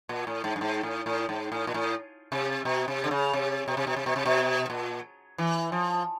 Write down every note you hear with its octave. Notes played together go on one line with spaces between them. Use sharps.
A#2
A2
G#2
G2
G#2
A2
A2
G#2
A2
A#2
A2
C3
B2
C3
D3
C#3
C3
B2
C3
B2
C3
B2
C3
B2
A#2
E3
F3